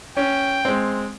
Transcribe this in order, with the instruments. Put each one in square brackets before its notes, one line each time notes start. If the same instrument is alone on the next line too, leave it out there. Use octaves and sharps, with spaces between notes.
[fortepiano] C#4 [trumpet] G5
[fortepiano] G#3 C4